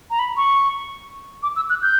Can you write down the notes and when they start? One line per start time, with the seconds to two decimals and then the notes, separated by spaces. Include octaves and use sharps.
0.10 A#5
0.19 B5
0.37 C#6
1.43 D6
1.56 E6
1.70 F#6
1.82 G6